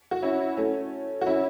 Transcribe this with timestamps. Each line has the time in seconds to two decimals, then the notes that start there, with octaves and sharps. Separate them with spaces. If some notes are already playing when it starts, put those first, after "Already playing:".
0.11 F#4
0.22 C#4 E4
0.57 A3 C#4
1.21 F#4
1.26 C#4 E4